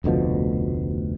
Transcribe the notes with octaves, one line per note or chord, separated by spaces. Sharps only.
F1 D2 B2 F3